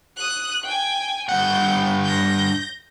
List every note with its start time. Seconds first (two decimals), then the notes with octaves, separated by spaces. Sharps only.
0.17 D#6 F#6
0.64 G5 G#5
1.29 G2 F#5 G6
2.04 G6 A#6